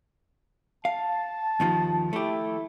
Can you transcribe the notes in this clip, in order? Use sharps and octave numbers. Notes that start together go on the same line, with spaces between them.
F5 A5
D#2 D#3 F3
A3 E4 G4